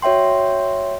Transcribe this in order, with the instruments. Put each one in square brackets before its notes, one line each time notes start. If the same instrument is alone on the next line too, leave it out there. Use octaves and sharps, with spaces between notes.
[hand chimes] F#4 C#5 E5 G5 C6